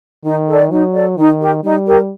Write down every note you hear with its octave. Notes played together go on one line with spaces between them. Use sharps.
D#3 D#4
A4 D5
F#3 D#4
A4 D5
D#3 D#4
G4 A#4
G3 D#4
G4 A#4